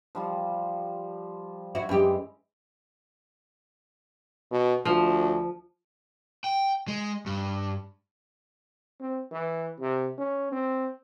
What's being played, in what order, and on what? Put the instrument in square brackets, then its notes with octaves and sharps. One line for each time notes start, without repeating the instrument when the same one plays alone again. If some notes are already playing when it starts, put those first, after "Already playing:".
[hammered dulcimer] F3 G3 F4
[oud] E4 F#4
[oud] F#2 G4 [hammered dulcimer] E3 G#3
[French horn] B2
[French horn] D2 [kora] F3
[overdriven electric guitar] G5
G#3
G2
[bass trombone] C4
E3
C3
C#4
C4